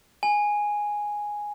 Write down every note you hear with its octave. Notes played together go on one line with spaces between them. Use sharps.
G#5